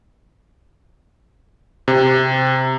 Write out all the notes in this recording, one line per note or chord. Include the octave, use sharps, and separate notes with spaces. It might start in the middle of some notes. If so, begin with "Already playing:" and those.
C3